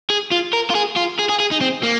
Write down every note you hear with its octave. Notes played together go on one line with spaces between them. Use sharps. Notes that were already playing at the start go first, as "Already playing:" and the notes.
G#4
F4
A#4
F4
G#4
F4
G#4
G#4
G#4
D#4
C4
A#3